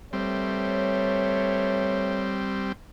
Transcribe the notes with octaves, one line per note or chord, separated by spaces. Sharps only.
G3 A3 C4 B4 C#5